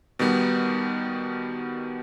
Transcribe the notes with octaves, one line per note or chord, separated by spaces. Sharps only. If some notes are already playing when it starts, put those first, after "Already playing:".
B2 D#3 G3 B3